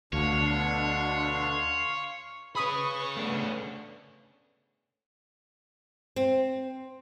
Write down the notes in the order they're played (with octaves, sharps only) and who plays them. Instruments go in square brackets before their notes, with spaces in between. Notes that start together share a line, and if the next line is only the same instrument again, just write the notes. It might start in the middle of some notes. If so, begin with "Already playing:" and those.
[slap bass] D2 [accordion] B2 D3 D4 [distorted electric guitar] C#5 [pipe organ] F5 C6
[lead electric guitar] C#4 G#4 [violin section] B4 C#6 [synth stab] B5 D#6
[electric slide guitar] A3 B3 D4
[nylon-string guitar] C4